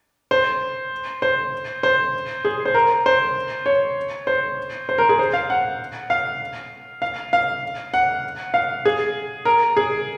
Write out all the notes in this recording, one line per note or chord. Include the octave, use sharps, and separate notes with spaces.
C5
C5
C5
G#4
C5
A#4
C5
C#5
C5
C5
A#4
G#4
C5
F5
F#5
F5
F5
F5
F#5
F5
G#4
A#4
G#4